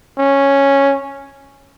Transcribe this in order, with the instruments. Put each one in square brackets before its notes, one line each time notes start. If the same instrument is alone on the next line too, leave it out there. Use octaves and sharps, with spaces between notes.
[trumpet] C#4